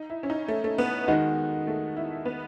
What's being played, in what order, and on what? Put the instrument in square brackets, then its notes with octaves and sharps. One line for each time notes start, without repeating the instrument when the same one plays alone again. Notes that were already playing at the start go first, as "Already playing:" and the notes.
Already playing: [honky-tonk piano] D#4
E4
C#4
D#4
A3
A3
B3
[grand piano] D#3 G#3 D#4 F#4
[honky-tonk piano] A3
E4
B3